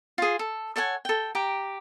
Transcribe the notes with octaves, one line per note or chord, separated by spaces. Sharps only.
F4 G#4
A4
A4 C#5 F#5 G#5
A4 G5
G4 G5 A#5